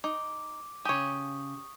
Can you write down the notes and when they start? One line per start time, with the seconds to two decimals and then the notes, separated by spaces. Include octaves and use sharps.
0.04 D#4 D6
0.85 C#3 G4 C#5 G#5 C#6 D#6